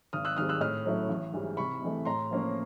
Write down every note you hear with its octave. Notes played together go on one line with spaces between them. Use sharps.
G#1 D#6 F6
E6 F#6
G#2 D#3 G3 C4 D#6 F6
E6 F#6
A2 D#6 F6
F#3 A3 C#4 E4
A1
G#2 E3 G3
C2 B5 C#6
C3 E3 A3
A2 A#5 C6
F3 A#3 C#4